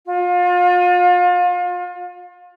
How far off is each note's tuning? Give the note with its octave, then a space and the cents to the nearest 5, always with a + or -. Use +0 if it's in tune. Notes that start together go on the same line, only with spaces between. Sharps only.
F4 +35